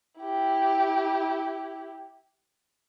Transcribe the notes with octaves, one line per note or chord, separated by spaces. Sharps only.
E4 G4